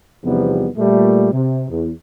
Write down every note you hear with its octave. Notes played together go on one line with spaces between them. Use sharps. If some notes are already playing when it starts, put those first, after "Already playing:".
E2 C3 F3 G3 B3 D#4
A#2 G3 A3
C3
E2